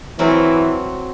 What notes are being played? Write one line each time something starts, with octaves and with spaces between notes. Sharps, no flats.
E3 F#3 C4 A#4